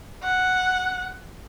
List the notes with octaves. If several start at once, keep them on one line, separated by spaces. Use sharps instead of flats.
F#5